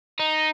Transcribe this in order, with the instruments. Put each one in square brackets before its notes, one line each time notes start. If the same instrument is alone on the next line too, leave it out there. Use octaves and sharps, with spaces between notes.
[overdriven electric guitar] D#4